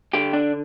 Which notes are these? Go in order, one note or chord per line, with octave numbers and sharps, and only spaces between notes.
D3 G4
D4